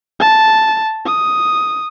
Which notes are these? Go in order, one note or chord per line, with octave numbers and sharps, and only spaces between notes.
A5
D#6